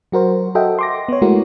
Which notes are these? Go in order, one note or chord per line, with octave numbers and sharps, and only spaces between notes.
F#3 F#4 A#4 C5
F#4 A4 D#5 E5 F#5 G5
C6 D6 A#6
B3 C#5
G#3 A3 E4 F#4 A#4